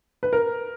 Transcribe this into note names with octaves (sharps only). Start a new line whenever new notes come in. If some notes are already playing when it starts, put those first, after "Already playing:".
B4
A#4